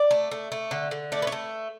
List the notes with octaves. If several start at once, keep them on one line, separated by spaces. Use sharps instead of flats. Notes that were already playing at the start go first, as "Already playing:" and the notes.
Already playing: D5
A3
A3
A3
D3
D3
A3 D5
B4
C#5
A3